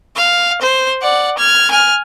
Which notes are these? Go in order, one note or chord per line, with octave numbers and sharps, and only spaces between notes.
F5
C5
D5 F#5
F6 G#6
G#5 F6